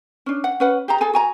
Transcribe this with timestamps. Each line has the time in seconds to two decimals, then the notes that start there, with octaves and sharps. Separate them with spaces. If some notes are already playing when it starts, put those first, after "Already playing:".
0.26 C#4 D4
0.44 F#5
0.60 C#4 B4 F#5
0.88 G4 G#4 A#5
1.01 G#4 A4 G#5
1.14 F#4 G#5 A#5